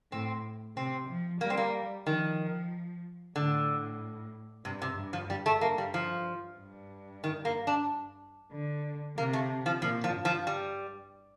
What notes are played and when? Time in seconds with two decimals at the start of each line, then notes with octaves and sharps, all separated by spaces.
0.12 A2 C4
0.77 C3 C4
1.09 F3
1.41 G3 A#3
1.50 C4
1.57 A#3
2.06 D#3 F3
3.36 A2 D3
4.65 G2 C3
4.82 C3
4.98 G2
5.13 F3
5.30 G2 G3
5.46 A3
5.61 A#3
5.78 G3
5.94 F3
6.59 G2
7.24 D#3
7.45 A#3
7.67 D4
8.53 D3
9.18 C3 A#3
9.33 A3
9.66 F3
9.82 A#2 F3
10.04 F3
10.15 G2
10.25 F3
10.47 G3